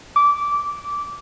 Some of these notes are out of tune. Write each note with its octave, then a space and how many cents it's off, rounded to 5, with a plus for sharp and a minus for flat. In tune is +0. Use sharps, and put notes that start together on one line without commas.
D6 -15